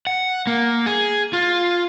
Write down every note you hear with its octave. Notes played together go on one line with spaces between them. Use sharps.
F#5
A#3
G#4
F4